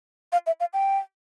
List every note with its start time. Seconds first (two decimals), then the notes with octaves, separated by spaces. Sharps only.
0.32 F5
0.47 E5
0.60 F5
0.73 G5